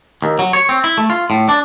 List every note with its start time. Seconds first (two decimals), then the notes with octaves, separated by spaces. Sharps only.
0.22 D#2
0.39 F#3
0.53 C#5
0.69 C4
0.84 E4
0.97 A3
1.10 F4
1.30 A2
1.49 D4